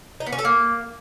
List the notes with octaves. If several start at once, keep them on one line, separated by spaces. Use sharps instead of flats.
D#4
B3
C#4
A4
A#3